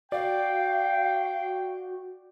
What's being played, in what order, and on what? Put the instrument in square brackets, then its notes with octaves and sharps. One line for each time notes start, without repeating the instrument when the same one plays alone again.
[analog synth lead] F#4 [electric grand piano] D5 [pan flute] F5 [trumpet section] G5